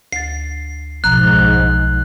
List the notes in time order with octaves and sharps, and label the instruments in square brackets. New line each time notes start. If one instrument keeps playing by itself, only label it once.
[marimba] D2 A6 [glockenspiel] C7
[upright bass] B1 [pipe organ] G#2 [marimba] F3 A#5 [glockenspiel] F#6